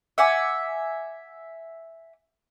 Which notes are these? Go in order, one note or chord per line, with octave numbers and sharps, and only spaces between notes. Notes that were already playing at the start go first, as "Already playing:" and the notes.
E5 F#5 G#5 D6